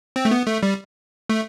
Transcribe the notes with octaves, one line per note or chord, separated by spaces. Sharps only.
C4
A3
B3
A3
G3
A3